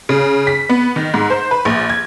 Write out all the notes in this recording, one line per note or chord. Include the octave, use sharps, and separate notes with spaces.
C#3
B6
B3
D#3
G#2
C5
B4
A#1
G#6